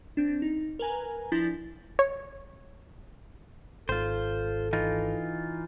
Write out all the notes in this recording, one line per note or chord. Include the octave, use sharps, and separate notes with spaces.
C4 D4
D#4
A#4 B4 G#5 A#5
F3 D4 E4 G6 A6 A#6
C#5
G#1 F4 A4 C5
E3 D#4 F4